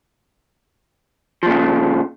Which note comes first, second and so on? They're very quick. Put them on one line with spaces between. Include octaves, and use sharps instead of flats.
F3 A#2 C#3